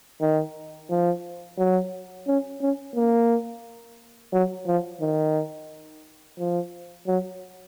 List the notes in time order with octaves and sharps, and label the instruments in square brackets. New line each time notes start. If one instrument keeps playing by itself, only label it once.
[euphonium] D#3
F3
F#3
C#4
C#4
A#3
F#3
F3
D#3
F3
F#3